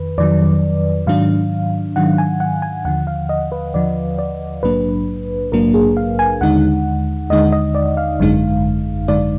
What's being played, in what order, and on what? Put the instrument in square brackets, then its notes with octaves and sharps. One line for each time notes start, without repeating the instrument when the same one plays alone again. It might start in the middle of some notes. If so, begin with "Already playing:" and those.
Already playing: [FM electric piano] F2 D#3 B4
F2 D#3 F#3 D5
G#2 D#3 F#3 D4 F5
G#2 D#3 F#3 D4 F#5
G#5
F#5
G#5
D#2 D3 F3 F#5
F5
D#5
B4
D#2 D3 F3 D5
D5
A#1 G#2 F#3 A#3 D4 B4
A#1 G#2 F#3 A#3 D4 A#4
G#4
F5
G#5
D#2 D3 G#3 D#4 F#5
D#2 D3 G#3 D#4 D#5
D#5
D5
F5
G#1 F#2 D3 G#3 D#4
G#1 F#2 D3 G#3 D#4 D5